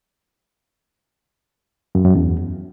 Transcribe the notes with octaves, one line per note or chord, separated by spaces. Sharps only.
F#2
F#2
E2